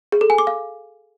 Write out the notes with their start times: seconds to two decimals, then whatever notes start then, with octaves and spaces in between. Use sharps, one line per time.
0.12 G#4
0.21 A4
0.30 G#5
0.38 D6
0.47 F5